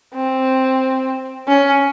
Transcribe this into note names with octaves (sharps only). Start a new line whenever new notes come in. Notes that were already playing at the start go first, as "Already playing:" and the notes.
C4
C#4